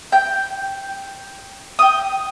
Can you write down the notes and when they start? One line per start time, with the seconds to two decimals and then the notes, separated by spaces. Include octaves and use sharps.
0.12 G5
1.79 G5 D#6